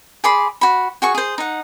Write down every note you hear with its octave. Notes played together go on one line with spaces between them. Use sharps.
G#4 D5 B5 C6
F#4 B5
F#4 G#4 C#6
G#4 C5
D#4 F#5